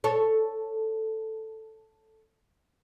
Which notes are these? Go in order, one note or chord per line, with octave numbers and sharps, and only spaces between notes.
A4 C#5